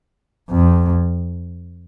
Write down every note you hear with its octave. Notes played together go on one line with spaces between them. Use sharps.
F2